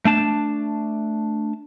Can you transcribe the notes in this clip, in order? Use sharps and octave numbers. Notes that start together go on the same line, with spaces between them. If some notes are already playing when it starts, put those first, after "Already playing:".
A3 D4 A5